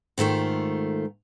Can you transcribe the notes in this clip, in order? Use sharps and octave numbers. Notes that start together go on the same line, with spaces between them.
G#2 D#3 A3 F4